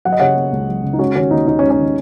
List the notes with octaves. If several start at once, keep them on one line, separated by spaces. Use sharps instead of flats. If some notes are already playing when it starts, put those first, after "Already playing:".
F#3 F#5
D#5
C#3 C#5 F#5
A#3
C#2
F#3
C#3
D#4
G#3 C#4 F#4
D#3 C#4 F#4
D#2 D#4
D#2 D#4
C#4
G#3
C#4
D#3 D#4